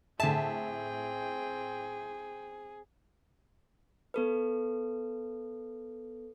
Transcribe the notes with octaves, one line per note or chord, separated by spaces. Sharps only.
A2 D3 C4 G#4 E5 G5 A5
B3 A4 B4